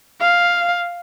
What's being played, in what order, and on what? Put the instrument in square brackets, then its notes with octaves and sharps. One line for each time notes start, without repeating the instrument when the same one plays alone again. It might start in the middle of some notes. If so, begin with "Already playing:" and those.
[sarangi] F5